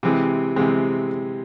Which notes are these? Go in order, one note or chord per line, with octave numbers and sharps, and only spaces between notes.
C3 E3 G#3 C4
C3 E3 G#3 C4